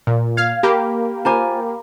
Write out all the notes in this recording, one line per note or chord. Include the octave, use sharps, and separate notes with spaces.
A#2
F5 G#6
A#3 G4 B5
F4 C5 G#5 A#5 B5 D6